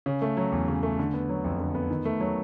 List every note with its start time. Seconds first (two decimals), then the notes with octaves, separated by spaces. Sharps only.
0.06 C#3
0.22 A3
0.37 F#3
0.52 E2
0.68 C#3
0.83 A3
0.99 D3
1.14 B3
1.29 F#3
1.44 F2
1.60 D3
1.75 B3
1.90 D#3
2.05 A3
2.20 F#3